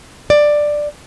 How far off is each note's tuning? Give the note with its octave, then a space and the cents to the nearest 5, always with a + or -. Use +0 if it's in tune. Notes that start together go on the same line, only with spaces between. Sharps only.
D5 +10